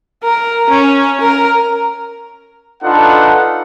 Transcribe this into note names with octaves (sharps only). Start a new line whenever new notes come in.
A#4
C#4
A#4
D4 D#4 F4 A4 B4 F#5